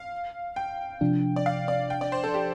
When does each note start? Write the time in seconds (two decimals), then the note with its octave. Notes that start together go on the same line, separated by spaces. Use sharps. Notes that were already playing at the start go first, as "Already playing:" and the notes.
Already playing: F5
0.56 G5
1.01 C3 F3 D4
1.36 D5
1.46 F5
1.68 D5
1.90 G5
2.01 D5
2.12 C5
2.24 A4
2.34 G4